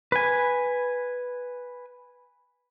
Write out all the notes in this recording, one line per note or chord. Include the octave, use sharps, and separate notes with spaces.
B4 G#5